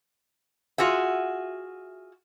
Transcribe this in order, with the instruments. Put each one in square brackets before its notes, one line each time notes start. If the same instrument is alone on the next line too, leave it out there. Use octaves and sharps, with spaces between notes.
[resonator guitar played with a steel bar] F4 F#4 G#4 E5